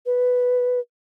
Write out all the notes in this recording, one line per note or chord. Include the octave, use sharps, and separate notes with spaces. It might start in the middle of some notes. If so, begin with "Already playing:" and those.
B4